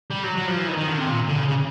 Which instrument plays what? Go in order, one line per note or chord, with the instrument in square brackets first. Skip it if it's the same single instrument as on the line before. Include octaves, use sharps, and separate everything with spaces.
[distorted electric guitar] G3
F#3
F#3
F3
E3
D#3
D#3
D3
C3
A#2
D3
C#3
C#3